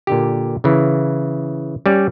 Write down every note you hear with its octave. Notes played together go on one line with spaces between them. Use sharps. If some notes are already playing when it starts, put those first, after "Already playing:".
A#2 D3 G4
C#3 E3
G3 C#4 D5